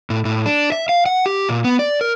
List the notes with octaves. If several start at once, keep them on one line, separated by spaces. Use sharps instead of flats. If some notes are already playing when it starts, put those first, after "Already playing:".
A2
A2
D4
E5
F5
F#5
G4
A#2
B3
D5
A#4